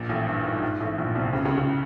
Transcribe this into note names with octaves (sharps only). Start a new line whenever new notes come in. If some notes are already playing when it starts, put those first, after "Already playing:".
Already playing: A#1 A#2
A1 A2
G2
G#2
G2
G#2
A1 A2
A#1 A#2
C2 C3
C#2 C#3
C#2 C#3
C#2 C#3